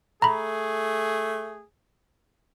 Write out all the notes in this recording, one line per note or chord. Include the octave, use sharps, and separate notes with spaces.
A3 G#4 A#5 B5